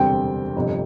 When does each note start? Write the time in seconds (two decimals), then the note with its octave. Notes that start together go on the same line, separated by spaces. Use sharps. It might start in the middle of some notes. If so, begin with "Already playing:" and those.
Already playing: E1 D2 C3 G3 C4 G5
0.56 G1 F2 C3